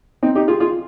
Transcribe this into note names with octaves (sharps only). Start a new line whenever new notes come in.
C4 D#4
D#4 G4
F4 G#4
F4 G#4